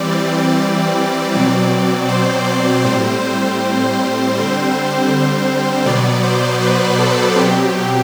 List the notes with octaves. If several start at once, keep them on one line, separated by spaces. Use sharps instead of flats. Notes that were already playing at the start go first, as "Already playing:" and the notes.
Already playing: E3 G3 C4 D5
B2 F#3 C4 D5
C5
D5
A2 G3 C4 C5
D3 G3 C4
B2 F#3 B3 D5
C5
B4
A4
B2 F#3 C4 G4